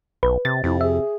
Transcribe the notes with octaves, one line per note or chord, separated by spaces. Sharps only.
B1 B4
C3 A6
F2 C3 E4
G#4 E5